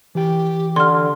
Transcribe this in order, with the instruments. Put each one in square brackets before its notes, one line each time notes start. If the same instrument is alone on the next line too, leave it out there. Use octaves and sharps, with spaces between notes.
[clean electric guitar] E3 G5 [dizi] G4
[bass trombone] D3 [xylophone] C6 F6